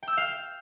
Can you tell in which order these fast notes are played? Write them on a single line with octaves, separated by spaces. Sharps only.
G5 E6 G6 F5